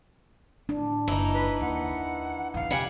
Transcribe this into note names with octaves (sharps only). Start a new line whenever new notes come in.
A2 D4
F#1 E3 D#4
B4
D#2 F#5
B1 E2 F5
F2 C3 G3 F#5 G#5